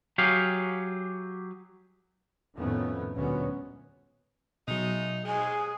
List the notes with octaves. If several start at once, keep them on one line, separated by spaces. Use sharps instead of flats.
F#3 G4 G#4 F5
F2 A2 D#3 A3 B3 C#4
D2 A#2 F#3 G#3 B3 C#4
B2 F#3 G#3 A3 D#4
D#2 G#2 G#3 G#4